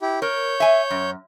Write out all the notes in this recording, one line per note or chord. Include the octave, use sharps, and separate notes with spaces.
E4 G4
A#4 C#5 G6
E5 G#5
F#2